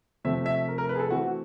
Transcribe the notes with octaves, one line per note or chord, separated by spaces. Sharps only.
C3 F3 A3 C4 E5
E5
A#4
A#4
B4
G#4
A4
E3 A3 C4 F#4